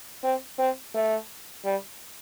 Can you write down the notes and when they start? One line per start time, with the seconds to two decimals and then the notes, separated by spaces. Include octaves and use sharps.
0.24 C4
0.58 C4
0.95 A3
1.65 G3